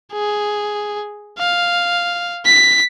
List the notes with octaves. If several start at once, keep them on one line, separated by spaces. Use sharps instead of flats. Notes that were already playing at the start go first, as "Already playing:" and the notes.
G#4
F5
B6